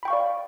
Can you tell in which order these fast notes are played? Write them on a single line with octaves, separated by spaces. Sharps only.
B5 G5 C#6 F5 D5